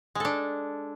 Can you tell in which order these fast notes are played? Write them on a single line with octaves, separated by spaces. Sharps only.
G#3 A4 D4